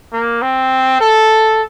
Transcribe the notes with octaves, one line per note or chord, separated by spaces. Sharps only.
A#3
C4
A4